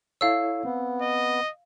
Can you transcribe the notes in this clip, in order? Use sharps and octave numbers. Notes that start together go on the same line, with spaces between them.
E4 A4 C#5 F5 E6
B3 C4
D#5